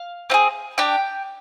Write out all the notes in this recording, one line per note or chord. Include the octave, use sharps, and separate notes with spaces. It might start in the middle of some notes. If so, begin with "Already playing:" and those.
Already playing: F5
C4 F4 G#4
D4 G4 G5